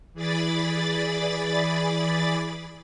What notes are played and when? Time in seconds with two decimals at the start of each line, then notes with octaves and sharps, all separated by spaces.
0.14 E3 G#4 D5 B5 A6